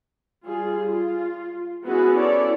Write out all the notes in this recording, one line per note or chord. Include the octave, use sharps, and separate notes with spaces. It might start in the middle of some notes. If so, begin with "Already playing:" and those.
G3 F4 G#4
F4
B3 C#4 E4 F#4 G#4 B4
E4 A4 C#5 D5